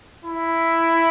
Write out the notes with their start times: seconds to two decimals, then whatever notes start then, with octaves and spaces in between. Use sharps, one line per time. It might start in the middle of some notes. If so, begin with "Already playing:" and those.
0.25 E4